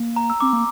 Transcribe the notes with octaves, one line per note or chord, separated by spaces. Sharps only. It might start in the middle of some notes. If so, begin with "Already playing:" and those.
Already playing: A#3
A#5
E6
C4 D6
A#3